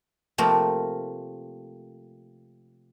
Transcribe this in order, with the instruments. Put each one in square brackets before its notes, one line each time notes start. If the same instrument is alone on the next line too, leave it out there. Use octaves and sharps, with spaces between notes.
[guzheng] C3 F3 A3 A#3 C4 A#4